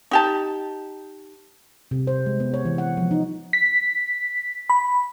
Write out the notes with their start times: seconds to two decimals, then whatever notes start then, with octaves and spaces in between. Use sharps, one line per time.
0.11 D#4 G4 A5
1.91 C3
2.07 C5
2.26 G#3
2.40 B3
2.54 C#5
2.65 E3
2.78 F#5
2.97 F3
3.11 D#4
3.53 B6
4.70 B5